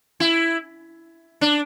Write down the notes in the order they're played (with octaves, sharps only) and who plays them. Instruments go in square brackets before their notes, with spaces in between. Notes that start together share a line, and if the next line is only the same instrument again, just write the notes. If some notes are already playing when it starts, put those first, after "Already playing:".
[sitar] E4
D4